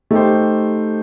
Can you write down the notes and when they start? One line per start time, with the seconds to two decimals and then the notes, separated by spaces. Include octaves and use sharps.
0.11 A3 D#4 G4 C5